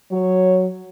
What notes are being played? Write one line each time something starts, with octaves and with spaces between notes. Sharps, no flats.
F#3 C#5